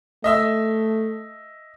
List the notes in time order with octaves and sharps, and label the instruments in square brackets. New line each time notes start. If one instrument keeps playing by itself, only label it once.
[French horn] A3 [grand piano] D#5 E5 E6